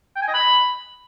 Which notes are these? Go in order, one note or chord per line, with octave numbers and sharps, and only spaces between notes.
G5
G#5
D#5
B5